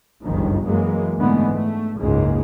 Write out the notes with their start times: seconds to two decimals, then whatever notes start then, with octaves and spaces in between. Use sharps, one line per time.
0.22 G1 C#2 F#2 D#3 F3
0.66 F#2 E3 F#3 G#3 A#3
1.18 G#2 D3 E3 G#3 A3 B3
1.51 A3
1.99 F#1 C#2 G#2 C#3 G#3 A#3